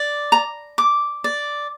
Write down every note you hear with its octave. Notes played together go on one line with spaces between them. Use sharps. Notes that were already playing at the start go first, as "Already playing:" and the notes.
Already playing: D5
A#5
D6
D5